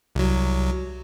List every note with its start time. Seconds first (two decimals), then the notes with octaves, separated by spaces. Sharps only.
0.15 C2 F#3